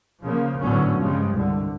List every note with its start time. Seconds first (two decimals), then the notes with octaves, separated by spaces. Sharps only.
0.23 C#3 F3 A#3
0.61 G#1 A2 D3 F#3 B3 C#4
0.99 G2 C#3 F3 G3 G#3
1.33 C2 D3